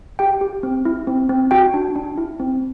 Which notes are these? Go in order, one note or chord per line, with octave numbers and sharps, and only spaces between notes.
G4 G5
G4
C4
E4
C4
C4
F#4 G5
D4
D4
E4
C4